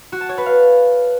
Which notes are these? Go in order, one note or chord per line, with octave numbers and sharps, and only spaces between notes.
F#4
A5
C#5
B4
F5